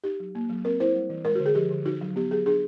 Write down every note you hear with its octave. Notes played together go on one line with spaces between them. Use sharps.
D#4 G4
F#3
A#3
F#3
C4 A#4
E4 C5
G3
E3
G#3 A#4
F#4
D3
G#4
F3 G4
D3
D#4 F#4
F#3
B3 G4
F#3 G#4
D4 G#4